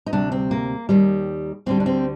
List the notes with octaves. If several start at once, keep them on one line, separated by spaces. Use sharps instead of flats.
D#4
D2 C3 G3 D4
C4
A#3
D#2 D#3 G3
D2 D3 G3 C4
D4
C4